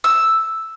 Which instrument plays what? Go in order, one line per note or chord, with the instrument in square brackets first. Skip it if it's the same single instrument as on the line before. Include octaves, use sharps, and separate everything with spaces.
[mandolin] E6